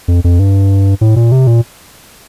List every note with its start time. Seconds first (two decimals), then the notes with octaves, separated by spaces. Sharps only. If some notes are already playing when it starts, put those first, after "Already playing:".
0.08 F2
0.24 F2
0.39 G2
1.01 A2
1.16 A#2
1.32 C3
1.47 A#2